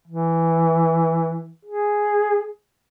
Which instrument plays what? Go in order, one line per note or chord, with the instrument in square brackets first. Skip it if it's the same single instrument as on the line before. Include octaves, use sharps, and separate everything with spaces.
[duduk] E3
G#4